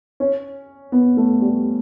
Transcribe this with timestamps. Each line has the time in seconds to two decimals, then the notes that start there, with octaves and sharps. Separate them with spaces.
0.20 C#4
0.92 B3
1.17 A3
1.42 G3